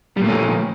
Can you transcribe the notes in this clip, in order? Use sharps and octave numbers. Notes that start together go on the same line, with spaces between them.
A#2 F3 G3 A3 C#4